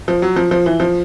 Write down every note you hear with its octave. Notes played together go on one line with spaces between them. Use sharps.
F3
F#3
F3
F3
E3
F3